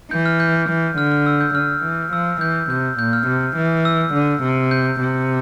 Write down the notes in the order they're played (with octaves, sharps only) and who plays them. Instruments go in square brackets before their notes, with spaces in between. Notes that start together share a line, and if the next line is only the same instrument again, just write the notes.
[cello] E3 [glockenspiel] G6
[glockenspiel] F6
G6
[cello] E3
[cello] D3 [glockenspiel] F6
[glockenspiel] F6
E6
G6
[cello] D3 [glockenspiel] F6
[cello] E3
[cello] F3 [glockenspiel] E6
[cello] E3 [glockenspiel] G6
[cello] C3 [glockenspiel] G6
[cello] A#2 [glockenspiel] G6
[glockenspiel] F6
[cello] C3
E3
[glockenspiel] E6
[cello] D3
C3
[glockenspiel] G6
[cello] C3